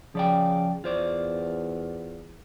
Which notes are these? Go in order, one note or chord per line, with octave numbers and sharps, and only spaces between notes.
C#3 F3 D5 G5
E2 F4 C5 D5